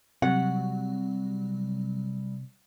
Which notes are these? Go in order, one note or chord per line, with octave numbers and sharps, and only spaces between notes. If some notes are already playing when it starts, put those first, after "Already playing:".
C3 F#3 G3 F#5